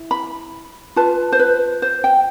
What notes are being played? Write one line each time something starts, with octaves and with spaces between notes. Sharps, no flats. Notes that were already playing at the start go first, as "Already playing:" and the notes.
Already playing: E4
B5
F4 B4 A5
C5
B4
C5
G5